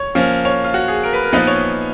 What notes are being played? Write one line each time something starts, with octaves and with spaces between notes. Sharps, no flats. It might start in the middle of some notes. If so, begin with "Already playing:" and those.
Already playing: C#5
F3 A#3 C#4
C#5
F4
F#4
G#4
A#4
B4
A#4
A#2 F3 B3 D#4 B4
C#5